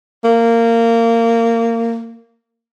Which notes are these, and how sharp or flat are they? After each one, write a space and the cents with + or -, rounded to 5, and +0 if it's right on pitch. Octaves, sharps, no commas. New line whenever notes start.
A#3 -20